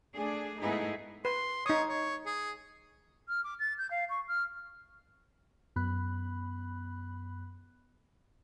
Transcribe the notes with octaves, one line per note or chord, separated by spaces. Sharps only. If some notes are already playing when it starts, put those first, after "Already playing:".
A3 D4 G#4
G#2 A3 B3 D#4 E4 G#4
B4 C6
D#4 C#5 D#6
C#5
G#4
F6
D6
A6
G6
F5
C#6
F6
F#2 B3 B5 F#6